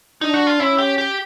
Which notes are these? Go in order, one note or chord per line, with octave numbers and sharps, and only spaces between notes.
D4 D#4
F#4
F4
C#4 E4
G4
G4